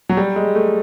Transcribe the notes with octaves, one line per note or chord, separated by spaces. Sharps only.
F#3
G3
G#3
A3